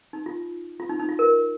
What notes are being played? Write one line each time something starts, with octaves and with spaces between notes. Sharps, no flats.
D#4
F4
F4
D#4
D#4
F4
A#4